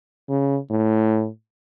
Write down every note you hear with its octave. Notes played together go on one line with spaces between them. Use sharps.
C#3
A2